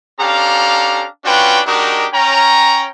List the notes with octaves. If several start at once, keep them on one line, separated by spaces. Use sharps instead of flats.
C#4 D4 G4 A4 F5 A#5
C#4 D4 F4 F#4 B4 G5
G#3 D4 D#4 F#4 G4 A#4
C#4 G5 A#5